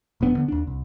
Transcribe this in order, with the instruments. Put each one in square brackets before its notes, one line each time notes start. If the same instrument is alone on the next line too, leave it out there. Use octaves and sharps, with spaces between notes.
[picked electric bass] E1 A#1 B3 D4
D3 B3
D#2 D4
C2